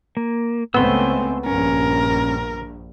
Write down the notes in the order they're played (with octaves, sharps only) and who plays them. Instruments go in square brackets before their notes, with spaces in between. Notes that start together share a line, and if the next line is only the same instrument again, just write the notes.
[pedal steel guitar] A#3
[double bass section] C#2 A3 C4 [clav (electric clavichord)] B3 [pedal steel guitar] G#5 C6 E6
[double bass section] A#1 G2 [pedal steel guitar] C#4 [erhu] A#4